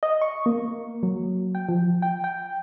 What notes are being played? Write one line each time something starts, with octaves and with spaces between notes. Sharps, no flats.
D#5
C#6
A#3
F#3
G5
F3
G5
G5